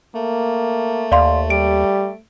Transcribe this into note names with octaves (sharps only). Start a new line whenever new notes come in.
A3 A#3
D#2 D5 F5 C6
G3 D7